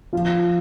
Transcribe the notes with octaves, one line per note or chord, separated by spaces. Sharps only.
F3